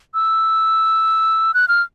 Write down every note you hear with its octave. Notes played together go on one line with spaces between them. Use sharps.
E6
F#6
F6